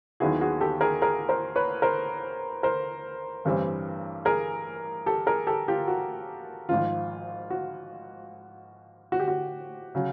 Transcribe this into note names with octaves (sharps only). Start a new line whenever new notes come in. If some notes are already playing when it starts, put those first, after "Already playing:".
D#2 D#3 F#3 B3 E4 F#4 G#4
F#4 G#4
G4 A4
G#4 A#4
G#4 A#4
A#4 C5
B4 C#5
A#4 C5
A#4 C5
A1 G2 E3 G3 C4
G#4 A#4
G4 A4
G#4 A#4
G4 A4
F4 G4
F#4
G#1 G#2 F3 F4
F#4
F#4
G4
F#4
C#3 F#3